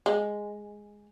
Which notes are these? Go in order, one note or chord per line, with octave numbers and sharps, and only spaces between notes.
G#3